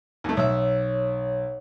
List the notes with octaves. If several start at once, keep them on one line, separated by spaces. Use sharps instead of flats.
D#2 A3
B1 C#5 E5